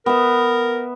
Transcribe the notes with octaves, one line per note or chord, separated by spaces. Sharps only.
B3 A#4 E5